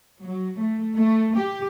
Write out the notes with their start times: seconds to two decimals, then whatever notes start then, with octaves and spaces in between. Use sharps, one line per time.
0.20 F#3
0.60 A3
0.98 A3
1.37 G4